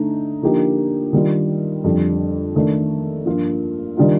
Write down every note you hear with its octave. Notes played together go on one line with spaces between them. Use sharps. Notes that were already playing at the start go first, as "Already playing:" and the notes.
Already playing: D3 A3 D#4
D3 F3 A#3 D#4 G4
D#3 G3 D4 F4
F2 D3 G3
D#3 A3 D4
G2 F3 A#3 F4
D#3 G3 D4 F4